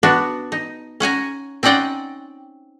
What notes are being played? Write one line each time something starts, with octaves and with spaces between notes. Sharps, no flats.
B3 D4 F#4
D#4
C#4 F#5 G#5 A#5
C4 C#4 D#4 D5 F#5 G5